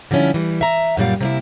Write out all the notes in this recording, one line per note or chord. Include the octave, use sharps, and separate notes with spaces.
D3 F3 G3 C#4 E4
E3 G3
E5 A#5
F#2 A#2 G3 F5
C3 A#3 E4